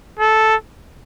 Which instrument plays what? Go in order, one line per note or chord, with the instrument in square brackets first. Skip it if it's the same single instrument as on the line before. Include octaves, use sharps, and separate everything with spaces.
[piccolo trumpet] A4